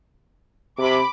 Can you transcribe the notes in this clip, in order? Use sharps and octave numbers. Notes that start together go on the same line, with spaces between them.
C3 B5 D6